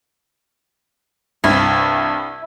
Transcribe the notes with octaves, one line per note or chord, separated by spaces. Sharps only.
C2 G2 E4